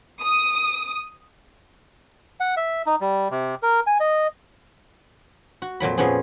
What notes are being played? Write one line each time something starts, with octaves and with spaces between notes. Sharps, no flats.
D#6
F#5
E5
D#4
G3
C3
A#4
G#5
D#5
F#4
F2 A#2 F#3 B5
A#2 F3 B3 C#4 G#4